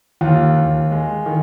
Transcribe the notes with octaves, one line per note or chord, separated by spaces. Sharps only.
D#2 F4
D#2
G#3
D#3